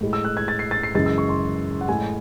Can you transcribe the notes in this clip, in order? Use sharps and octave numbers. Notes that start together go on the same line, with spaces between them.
A2 G#3
E6
F#6
G#6
A6
C7
A6
C7
F#2 C#3 E3 G#3 A6
E6
C#6
C6
F#5
A2 G#3 G#5